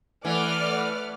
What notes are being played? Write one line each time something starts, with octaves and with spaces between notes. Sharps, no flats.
E3 A3 B4 D5 F#5 D6 F6